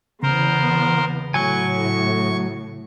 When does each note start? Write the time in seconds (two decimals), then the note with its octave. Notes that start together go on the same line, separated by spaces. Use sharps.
0.23 E2 C#3 B3 A#4 C5
1.34 A2 F#3 G#5 C#6